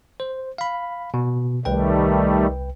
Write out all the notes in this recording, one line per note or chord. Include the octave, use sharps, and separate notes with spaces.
C5
F5 B5
B2
C2 D#3 G3 A3 B4 G5